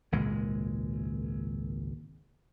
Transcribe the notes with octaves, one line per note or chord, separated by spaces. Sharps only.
G#1 C#2 A#2 G#3